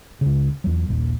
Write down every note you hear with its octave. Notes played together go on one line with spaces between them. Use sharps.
C#2 C#3
E2 F#3
D#1 A#1